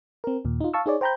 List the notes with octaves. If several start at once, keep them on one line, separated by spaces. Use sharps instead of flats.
C4 A#4
D#2 A#2
D#4 F4
F5 A5 C#6 E6
D#4 G#4 C#5 D5
C5 G5 A#5 B5 G6